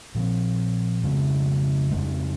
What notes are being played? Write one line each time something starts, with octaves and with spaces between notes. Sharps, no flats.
A#2 F3 C4
F2 C#3 G#3
F2 C#3 G#3